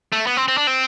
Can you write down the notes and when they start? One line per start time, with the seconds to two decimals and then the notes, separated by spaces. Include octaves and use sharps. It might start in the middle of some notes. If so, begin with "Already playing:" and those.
0.13 A3
0.27 B3
0.37 C4
0.48 C4
0.58 D4
0.67 C4